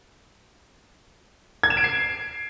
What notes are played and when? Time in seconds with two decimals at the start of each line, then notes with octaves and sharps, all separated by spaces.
1.63 G#6
1.70 E7
1.77 D7
1.84 C7